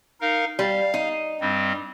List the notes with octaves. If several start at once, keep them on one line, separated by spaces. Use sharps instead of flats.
D#4 A#4 F5
G3 F5
D#4
G2 G3 C4